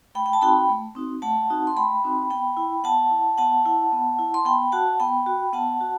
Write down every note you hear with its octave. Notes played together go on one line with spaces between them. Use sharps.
A3 G5 B5
G5
A5
C4 D#4 F#4 G5 B5
A3
C4 D#4 F#4
A3 F#5 A5
C4 D#4 F#4
C6
A3 G5 B5
C4 D#4 F#4
B3 G5 B5
E4
B3 F#5 A5
E4
B3 F#5 A5
E4
B3
E4
C6
B3 G5 B5
F#4 F#5 A5
B3 G5 B5
F#4
B3 F#5 A5
F#4